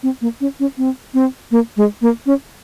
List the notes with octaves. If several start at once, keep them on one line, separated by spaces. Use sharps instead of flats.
C4
A#3
C#4
C#4
C4
C4
A#3
G#3
A#3
C#4